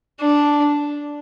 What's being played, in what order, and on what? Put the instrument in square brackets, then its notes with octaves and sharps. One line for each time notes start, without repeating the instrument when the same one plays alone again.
[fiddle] D4